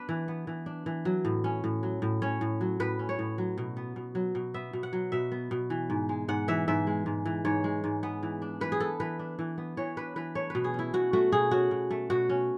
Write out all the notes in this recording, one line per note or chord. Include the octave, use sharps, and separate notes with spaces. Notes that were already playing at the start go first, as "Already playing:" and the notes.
Already playing: B3 D4 B4
E3
B3
E3
D4
E3
F#3
A2
C#4
A2
F#3
A2
C#4 C#5
A2
F#3
A2 B4
C#4
C#5
A2
F#3
B2
B3
B2
F#3
B2
B3 E5
B2
F#5
F#3
B2 E5
B3
B2
E3
G#2
G#3
G#2 F#5
E3 E5
G#2 E5
G#3
G#2
E3
G#2 C#5
G#3
G#2
B3
E3
D4
E3 B4
G#4
B3 A4
E3 B4
D4
E3
B3
E3 C#5
D4 B4
E3 B4
A3 C#5
B2 B4
G#4
C#4 E4
B2 F#4
A3 F#4
B2 G#4
C#4 F#4
B2
A3
B2 F#4
C#4